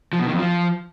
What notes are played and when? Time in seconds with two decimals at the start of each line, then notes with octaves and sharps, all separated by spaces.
0.13 F3
0.19 B2
0.26 D#3
0.33 F2
0.39 F3